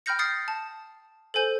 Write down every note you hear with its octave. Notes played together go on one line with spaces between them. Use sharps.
G5 B5 F6 G6 A#6 C#7
D#6 F6 G6 A6 C7 C#7
A5
A4 C5 G#5 G6